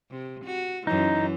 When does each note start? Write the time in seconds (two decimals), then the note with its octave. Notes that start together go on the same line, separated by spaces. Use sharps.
0.11 C3
0.45 F#4
0.87 F#2 E3 D#4